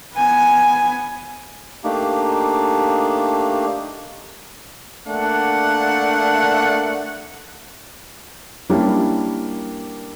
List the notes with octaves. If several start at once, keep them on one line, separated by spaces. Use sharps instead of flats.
B3 G#5
A3 A#3 D4 D#4 G4
A3 A#3 D4 F#5
G3 A#3 C#4 D4 E4